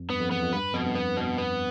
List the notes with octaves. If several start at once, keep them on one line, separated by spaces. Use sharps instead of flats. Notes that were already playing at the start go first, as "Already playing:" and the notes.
Already playing: F2
G2 B3
F2
E2 B3
F2
G2 B4
F2 B2
G2
B3
B2
B3